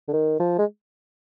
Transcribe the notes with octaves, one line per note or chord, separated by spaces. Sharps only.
D3
D#3
F3
G#3